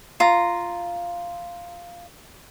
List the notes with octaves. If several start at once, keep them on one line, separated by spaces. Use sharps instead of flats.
F4 A#5